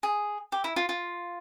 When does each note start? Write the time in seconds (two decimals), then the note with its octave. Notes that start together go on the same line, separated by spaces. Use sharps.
0.03 G#4
0.52 G4
0.64 E4
0.76 F4
0.89 F4